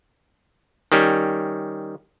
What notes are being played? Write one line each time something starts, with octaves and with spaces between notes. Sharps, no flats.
D#3 G3 C#4